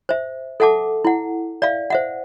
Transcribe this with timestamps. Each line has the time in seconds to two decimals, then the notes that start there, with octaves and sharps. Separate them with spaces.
0.09 C5 E5
0.60 A4 E5 F#5 A5 D6
1.05 E4 F#5
1.62 D5 E5 F5
1.90 C5 E5 F#5